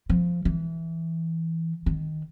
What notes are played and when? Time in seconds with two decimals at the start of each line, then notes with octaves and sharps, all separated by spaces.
0.10 F3
0.45 E3
1.86 D#3